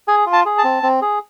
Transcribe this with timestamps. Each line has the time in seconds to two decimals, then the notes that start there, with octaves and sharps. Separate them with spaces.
0.08 G#4 G#5
0.26 F4
0.33 A5
0.46 G#4
0.58 A5
0.64 C4
0.83 C4
1.02 G#4